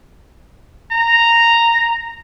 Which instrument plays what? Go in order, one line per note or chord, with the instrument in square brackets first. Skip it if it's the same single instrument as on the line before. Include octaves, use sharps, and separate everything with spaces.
[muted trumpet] A#5